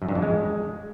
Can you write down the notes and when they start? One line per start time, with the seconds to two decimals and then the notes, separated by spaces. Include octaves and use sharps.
0.02 F#2
0.09 G2
0.15 F2
0.22 G#3